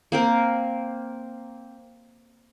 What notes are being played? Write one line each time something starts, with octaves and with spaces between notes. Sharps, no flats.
A#3 C4 A#4